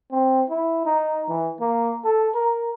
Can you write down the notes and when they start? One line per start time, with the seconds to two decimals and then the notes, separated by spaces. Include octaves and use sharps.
0.11 C4
0.49 E4
0.85 D#4
1.29 E3
1.60 A#3
2.04 A4
2.34 A#4